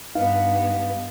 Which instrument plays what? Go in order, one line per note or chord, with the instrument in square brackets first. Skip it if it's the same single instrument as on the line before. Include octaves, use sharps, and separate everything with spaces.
[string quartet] G2 B3 [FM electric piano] D#4 [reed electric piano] F5